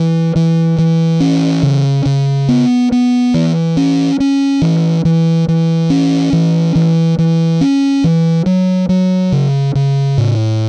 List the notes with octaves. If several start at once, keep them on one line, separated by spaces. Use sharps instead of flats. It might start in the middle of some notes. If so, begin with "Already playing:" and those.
Already playing: E3
E3
E3
C#4
C#3
C#3
B3
B3
E3
C#4
C#4
E3
E3
E3
C#4
E3
E3
E3
C#4
E3
F#3
F#3
C#3
C#3
A2